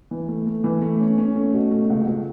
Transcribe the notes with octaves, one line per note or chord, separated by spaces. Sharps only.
E3
A3
A3
E3
A3
C#4
C#4
A3
B2
A3
C#2
C#2